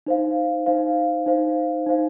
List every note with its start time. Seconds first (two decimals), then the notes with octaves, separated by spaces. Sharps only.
0.07 D#4 C5 F5
0.66 D#4 C5 F5
1.26 D#4 C5 F5
1.86 D#4 C5 F5